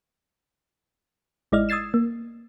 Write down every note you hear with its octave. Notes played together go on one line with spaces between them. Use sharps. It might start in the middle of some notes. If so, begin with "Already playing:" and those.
A1 G#3 E4 D5 D#5 F6
D#6 E6 G#6 A6 C7 E7
A#3